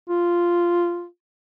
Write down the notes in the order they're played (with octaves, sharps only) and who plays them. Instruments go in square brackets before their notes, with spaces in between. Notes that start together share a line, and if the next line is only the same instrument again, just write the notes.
[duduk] F4